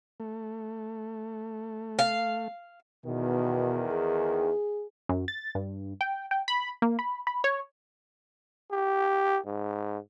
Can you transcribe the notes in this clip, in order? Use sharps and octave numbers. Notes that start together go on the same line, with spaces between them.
A3
F5
E2 B2 D#3
G#4
F#2
A6
G2
G5
G5
B5
A#3
B5
B5
C#5
G4
G#2